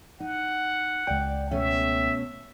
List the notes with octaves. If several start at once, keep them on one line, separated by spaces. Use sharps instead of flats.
D#4 F#5
C#2 D5 G5
B2 A3 C#4 E5